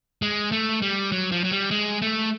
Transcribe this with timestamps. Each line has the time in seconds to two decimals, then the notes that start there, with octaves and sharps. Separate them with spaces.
0.22 G#3
0.52 A3
0.82 G3
1.12 F#3
1.32 F3
1.44 F#3
1.51 G3
1.71 G#3
2.02 A3